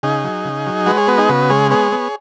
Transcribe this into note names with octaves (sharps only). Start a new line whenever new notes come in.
C#3 D#4 G#4
F#3
C#3
F#3
G#3 F#4 B4
G#4 C#5
B3 F#4 B4
D#4 G#4
C#3 F#4 B4
G#3 G#4 C#5
B3 G#4 C#5
B3